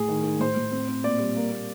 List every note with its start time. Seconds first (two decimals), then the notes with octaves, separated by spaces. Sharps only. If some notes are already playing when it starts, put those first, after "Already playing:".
Already playing: A2 G#4
0.08 D#3
0.24 D#3
0.40 A2 C5
0.56 A2
0.71 C4
0.88 C4
1.03 A#2 D5
1.19 G3
1.36 A#3
1.51 A#3